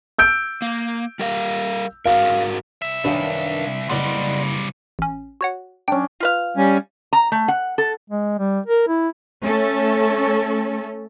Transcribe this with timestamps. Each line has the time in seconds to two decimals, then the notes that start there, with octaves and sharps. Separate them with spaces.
0.19 E6 G6 D7
0.62 A#3
1.19 G3 A#4 F5
2.06 G#2 F#4 A#4 F5
2.82 C2 E5
3.04 F#2 D#3 D4 B4 F5
3.89 F#1 C#3 G3 B3 D5 D#5 C6
4.99 A1 C#4
5.41 F#4 C#5 F#5
5.88 F#3 C#4 D4 G5
6.20 F4 B4 F5
6.57 G3 C#4
7.13 A#5
7.32 A3
7.48 F#5
7.78 A4
8.10 G#3
8.39 G3
8.66 A#4
8.88 E4
9.44 A3 C#4 A4